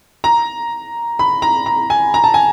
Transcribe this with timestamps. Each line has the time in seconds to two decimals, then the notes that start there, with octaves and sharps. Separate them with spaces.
0.24 A#5
1.19 B5
1.42 A#5
1.66 A#5
1.90 G#5
2.14 A#5
2.24 A5
2.34 G#5